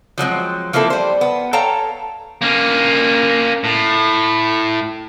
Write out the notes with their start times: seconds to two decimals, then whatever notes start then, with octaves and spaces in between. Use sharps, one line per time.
0.18 F3 F#3 G#3 C4
0.73 F3 A#3 C4 E4 A4
0.90 G3 C5
1.21 B3
1.53 A4 C#5 F5 G5 A5 A#5
2.42 A#3 C#4
3.64 A2